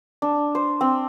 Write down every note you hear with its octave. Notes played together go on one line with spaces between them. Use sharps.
D4
C5
C4